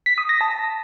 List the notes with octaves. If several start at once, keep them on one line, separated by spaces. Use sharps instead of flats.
B6
D#6
A#6
A5